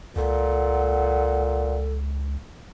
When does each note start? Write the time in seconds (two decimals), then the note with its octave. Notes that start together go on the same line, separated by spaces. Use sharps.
0.16 C#2 A#2 A4 F#5